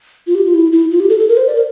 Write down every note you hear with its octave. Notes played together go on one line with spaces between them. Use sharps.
F4
G4
F4
E4
E4
F4
G4
A4
A4
A#4
C5
D5
A#4